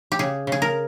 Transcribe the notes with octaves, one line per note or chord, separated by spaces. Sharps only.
G4
C#3 G#4
C#3 G#4
A#4